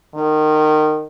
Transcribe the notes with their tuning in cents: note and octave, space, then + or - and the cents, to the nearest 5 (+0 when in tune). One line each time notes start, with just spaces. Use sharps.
D#3 -25